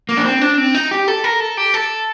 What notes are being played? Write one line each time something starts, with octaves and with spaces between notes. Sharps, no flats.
A#3
D4
C4
D4
C4
D#4
G4
A4
A#4
A4
G4
A4